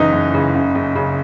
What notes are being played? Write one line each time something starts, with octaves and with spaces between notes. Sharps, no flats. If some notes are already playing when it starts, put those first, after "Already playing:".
Already playing: F#1 E3 D#4
F#1
C#3
F#1
F#1
C#3